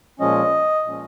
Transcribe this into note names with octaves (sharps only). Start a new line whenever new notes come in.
A#2 F3 G#3 C#4 D#5
A#2 F3 G#3 C#4